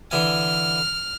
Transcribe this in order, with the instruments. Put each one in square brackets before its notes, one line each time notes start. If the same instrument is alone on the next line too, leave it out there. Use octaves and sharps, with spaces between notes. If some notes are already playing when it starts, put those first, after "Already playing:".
[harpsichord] D3 E3 G#5 [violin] F6